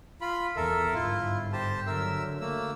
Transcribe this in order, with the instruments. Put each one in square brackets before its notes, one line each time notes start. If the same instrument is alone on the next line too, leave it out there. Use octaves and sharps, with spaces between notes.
[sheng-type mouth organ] F4 B5
[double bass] E2 [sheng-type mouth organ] A4 A#4 E5
[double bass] G1 G#2 [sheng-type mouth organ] E4 F4
[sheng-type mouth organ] G4 C5 A5
[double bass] D3 F#3 [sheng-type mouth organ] A#4 E5 E6
[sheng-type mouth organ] A3 A#3 E6